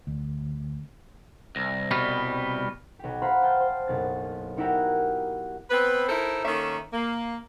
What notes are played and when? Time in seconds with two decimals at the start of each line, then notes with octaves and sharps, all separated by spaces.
0.07 D2
1.56 C2 A#6
1.91 B2 G3 B3 C#6 F6
2.99 B1 G4
3.22 C5 F5 F#5 A#5 B5
3.42 G5 A5 D#6 F6 G6
3.60 C5
3.88 F#1 B1 A6
4.57 B3 D#4 E4 F#4 G4 A#4
5.70 B3 C4 B4
6.09 D#4 E4 A4 A#4 C5
6.45 D#3 A#3 C#4 A4 E5
6.93 A#3